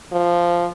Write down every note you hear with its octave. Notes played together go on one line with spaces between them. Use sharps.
F3